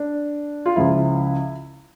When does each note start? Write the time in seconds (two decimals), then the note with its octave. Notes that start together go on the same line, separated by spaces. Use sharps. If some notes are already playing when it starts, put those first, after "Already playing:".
Already playing: D4
0.66 F4
0.76 C#2 C#3 F3 E4